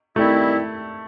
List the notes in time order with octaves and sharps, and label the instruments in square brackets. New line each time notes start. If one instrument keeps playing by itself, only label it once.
[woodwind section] D#3 G3 C4 E4 [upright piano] A3